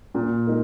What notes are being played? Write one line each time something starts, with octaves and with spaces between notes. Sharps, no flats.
A#2
G#3 D#4 A#4